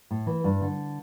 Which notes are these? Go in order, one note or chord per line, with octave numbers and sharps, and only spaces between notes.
A2
E3
G2
D3